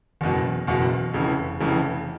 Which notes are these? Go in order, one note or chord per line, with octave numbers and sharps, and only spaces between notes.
F#1 E2 B2
F#1 E2 B2
F1 F2 C#3 E3
F1 F2 C#3 E3